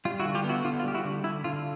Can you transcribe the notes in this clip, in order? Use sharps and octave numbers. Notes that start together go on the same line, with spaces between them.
G3 F4
E4 F#4
D3
F4 G4
B3
E4 F#4
D3 F4
F4
G3 G4
E4 F#4
D3
D3 E4
D3 F4